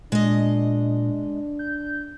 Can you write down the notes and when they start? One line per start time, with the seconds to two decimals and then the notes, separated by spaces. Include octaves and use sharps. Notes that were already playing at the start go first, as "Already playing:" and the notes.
0.12 A#2 G#3 D4 D#5
1.59 G6